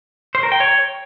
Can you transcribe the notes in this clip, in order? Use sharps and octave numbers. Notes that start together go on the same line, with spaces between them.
C5
A#4
G5
C#5